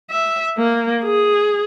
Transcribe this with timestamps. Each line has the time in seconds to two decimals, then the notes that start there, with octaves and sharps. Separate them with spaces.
0.10 E5
0.58 A#3
1.04 G#4